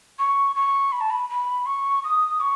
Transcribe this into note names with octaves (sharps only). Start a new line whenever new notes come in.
C#6
C#6
B5
A5
B5
B5
C#6
D#6
C#6